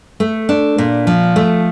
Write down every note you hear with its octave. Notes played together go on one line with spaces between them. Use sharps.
A3
D4
A#2
F3
A3